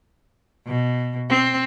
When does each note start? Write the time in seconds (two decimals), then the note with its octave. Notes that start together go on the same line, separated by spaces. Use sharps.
0.66 B2
1.29 C4